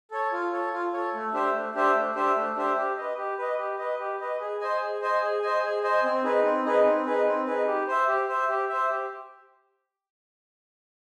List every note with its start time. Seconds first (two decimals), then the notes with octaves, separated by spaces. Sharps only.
0.11 A4 C#5
0.32 F4
0.52 A4 C#5
0.73 F4
0.93 A4 C#5
1.14 A3
1.33 D4 G4 C5 E5
1.54 A3
1.75 D4 G4 C5 E5
1.95 A3
2.15 D4 G4 C5 E5
2.36 A3
2.57 D4 G4 C5 E5
2.76 G4
2.97 B4 D#5
3.18 G4
3.38 B4 D#5
3.59 G4
3.79 B4 D#5
3.99 G4
4.20 B4 D#5
4.40 G#4
4.61 C5 D#5 G#5
4.81 G#4
5.01 C5 D#5 G#5
5.22 G#4
5.42 C5 D#5 G#5
5.63 G#4
5.83 C5 D#5 G#5
6.03 C4
6.24 D#4 G#4 B4
6.44 C4
6.65 D#4 G#4 B4
6.85 C4
7.06 D#4 G#4 B4
7.26 C4
7.46 D#4 G#4 B4
7.67 G4
7.87 C5 E5
8.08 G4
8.28 C5 E5
8.49 G4
8.69 C5 E5
8.89 G4